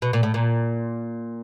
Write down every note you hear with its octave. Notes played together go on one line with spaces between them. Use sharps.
B2
A#2
A2
A#2